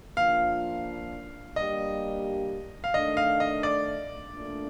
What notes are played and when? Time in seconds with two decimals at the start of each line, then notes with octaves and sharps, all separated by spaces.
0.17 F3 A#3 D4 F4 F5
1.56 G3 A#3 D4 G4 D#5
2.84 F5
2.94 D#3 A3 D4 D#5
3.17 F5
3.40 D#5
3.63 D5
4.33 A#2 A3 D4